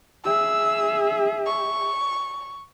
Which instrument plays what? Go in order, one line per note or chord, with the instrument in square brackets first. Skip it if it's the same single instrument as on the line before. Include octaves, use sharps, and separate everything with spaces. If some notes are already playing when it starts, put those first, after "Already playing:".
[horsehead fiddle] G#4 E5 [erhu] E6
[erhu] C#6